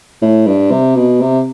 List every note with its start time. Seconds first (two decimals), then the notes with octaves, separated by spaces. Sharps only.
0.22 A2
0.47 G2
0.71 C3
0.96 B2
1.21 C3